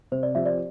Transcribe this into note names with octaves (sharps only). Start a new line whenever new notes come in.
C3 C5
D5
F3 C4 G4 E5
D5